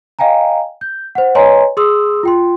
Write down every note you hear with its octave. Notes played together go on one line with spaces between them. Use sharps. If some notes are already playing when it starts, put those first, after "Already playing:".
D#5 F5 G5 G#5 A#5
G6
C5 F#5
B4 C#5 D#5 G#5 A#5 C6
G#4 C6 D#6 E6
F4 G5 C6